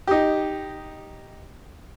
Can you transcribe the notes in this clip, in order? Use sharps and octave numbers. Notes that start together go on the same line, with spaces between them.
D#4 G4